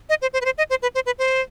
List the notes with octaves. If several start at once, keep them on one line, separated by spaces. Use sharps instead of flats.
D#5
C5
C5
B4
C5
D#5
C5
B4
C5
B4
C5